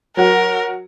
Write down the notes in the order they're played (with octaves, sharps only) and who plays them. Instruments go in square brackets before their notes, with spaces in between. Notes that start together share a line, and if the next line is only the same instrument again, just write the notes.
[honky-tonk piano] F#3 F#4 [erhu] A#4